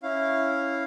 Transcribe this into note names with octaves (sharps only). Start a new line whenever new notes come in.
C#4 E4 F5